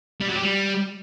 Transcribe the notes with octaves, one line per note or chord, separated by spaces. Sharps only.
G3
F#3
G4
G3